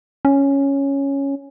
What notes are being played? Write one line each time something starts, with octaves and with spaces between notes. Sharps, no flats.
C#4